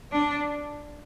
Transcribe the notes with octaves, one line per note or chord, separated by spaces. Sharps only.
D4